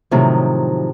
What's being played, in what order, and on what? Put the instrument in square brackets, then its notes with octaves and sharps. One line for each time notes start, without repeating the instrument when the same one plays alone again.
[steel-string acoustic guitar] A2 C3 D#3 F3 F#3